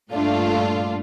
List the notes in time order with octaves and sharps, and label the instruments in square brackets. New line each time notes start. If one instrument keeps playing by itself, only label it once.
[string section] G2 A#2 A3 D4 F4